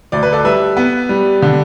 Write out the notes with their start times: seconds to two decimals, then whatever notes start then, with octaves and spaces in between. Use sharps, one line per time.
0.12 D2 D5
0.23 B4
0.33 A4 D5
0.44 G3 B4 E5
0.77 B3
1.09 G3
1.42 D3